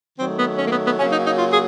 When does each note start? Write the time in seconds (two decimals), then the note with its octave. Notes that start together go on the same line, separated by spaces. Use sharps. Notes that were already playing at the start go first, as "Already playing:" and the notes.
0.18 D#3 F#3 A3 C4
0.38 B3
0.58 C#4
0.66 A#3
0.72 B3
0.85 B3
0.98 C#3 F#3 A#3 C#4
1.12 D#4
1.25 D#4
1.38 F4
1.52 G#4